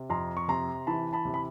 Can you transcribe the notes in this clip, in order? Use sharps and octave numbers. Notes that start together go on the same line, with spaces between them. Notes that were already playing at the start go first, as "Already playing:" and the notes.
Already playing: C3
F2 A#5 C6
C#6
C3 A#5 C6
E3 A5 B5
A5 B5
C3
B5